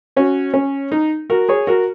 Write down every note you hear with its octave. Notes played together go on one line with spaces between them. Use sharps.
C#4 F#4
C#4
D#4
F#4 A#4
G#4 C#5
F#4 A#4